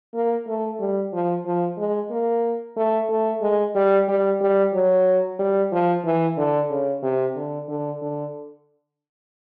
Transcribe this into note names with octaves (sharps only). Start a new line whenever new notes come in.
A#3
A3
G3
F3
F3
G#3
A#3
A3
A3
G#3
G3
G3
G3
F#3
G3
F3
E3
D3
C#3
C3
D3
D3
D3